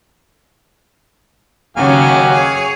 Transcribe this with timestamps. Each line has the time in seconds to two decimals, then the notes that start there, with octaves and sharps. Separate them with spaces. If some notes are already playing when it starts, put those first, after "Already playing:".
1.77 D#2 C#3 F#3 C#4 G4 F5 G#5
2.30 G#4 C#5